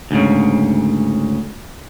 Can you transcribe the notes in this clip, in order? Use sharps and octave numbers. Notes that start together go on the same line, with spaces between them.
D2 G#2 C#3